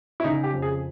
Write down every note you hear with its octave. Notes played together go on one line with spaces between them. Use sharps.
E4
C#3 D#4
G4
F2
G#4